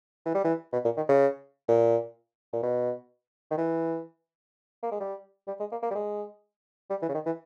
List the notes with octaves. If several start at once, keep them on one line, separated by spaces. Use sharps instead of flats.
E3
G3
E3
B2
A#2
D#3
C#3
A#2
A#2
B2
D#3
E3
A#3
G#3
G3
G3
G#3
A#3
A#3
G3
G#3
G3
E3
C#3
D#3
E3